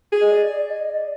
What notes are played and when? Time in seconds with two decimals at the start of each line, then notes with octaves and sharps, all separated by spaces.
0.12 G#4
0.21 D#5
0.31 D5
0.51 D5
0.70 D#5
0.89 D5